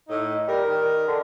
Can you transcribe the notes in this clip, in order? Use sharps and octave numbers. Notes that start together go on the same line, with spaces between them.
A2 D#4
G3 A#4
D#3
D3